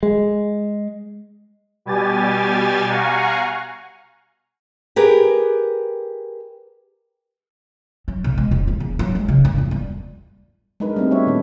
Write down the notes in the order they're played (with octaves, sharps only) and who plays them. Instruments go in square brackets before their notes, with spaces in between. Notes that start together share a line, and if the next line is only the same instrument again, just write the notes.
[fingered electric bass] G#3
[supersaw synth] B2 G3 G4 G#5 A6
F5 F#5 G#5 A#5 C#6
[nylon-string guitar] G4 G#4 A#4 B4
[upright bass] F#3
B1
G#3
E1
C#2
E2
F#3
G#3
C#3
G2
E2
G3
[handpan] G#3 D4 D#4 A#4 B4
G3 A3 C4 D#4
B3 D4 F#4 C#5 E5
A#2 D#3 B4